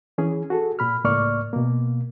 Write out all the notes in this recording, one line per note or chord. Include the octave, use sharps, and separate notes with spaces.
E3 C#4 G#4
F#4 G#4 A4
A#2 B5 F6
C#2 A2 A#3 D5 C#6 F6
B2 A#3